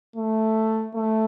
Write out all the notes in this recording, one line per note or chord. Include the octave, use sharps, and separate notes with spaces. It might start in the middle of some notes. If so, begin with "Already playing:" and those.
A3
A3